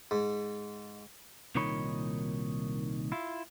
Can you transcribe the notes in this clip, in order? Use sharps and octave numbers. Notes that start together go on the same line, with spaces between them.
G#2
C2 A#2 D#3 D#4 C#5 B5
E4 F4